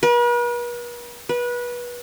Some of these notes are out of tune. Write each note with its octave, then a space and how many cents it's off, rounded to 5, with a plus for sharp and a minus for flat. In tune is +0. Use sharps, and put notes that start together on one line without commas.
B4 -45
B4 -25